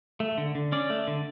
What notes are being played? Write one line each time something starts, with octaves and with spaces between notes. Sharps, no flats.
A3
D3
D3
C#4 D5
A3
D3